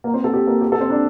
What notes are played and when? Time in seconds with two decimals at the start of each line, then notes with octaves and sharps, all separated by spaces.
0.04 A#3 A#4
0.14 C4 C5
0.24 A4
0.34 G4
0.47 A#3 A#4
0.61 G4
0.72 A4
0.81 C4 C5
0.90 D4 D5